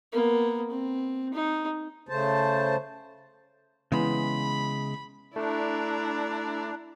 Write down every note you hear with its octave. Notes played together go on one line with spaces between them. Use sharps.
A#3 B3
C4
D#4
C#3 A3 C5 A5
C#3 E3 G#3 B3 B5
A3 D4 E4 D5 A#5